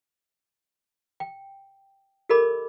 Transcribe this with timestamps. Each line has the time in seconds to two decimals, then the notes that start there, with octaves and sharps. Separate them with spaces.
1.20 G5
2.29 G4 A4 A#4 D#5 B5 D6